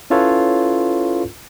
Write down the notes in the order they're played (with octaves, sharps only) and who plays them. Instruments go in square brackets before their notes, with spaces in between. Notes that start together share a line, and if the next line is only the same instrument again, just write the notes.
[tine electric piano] C#4 E4 F4 A4 B4 C#5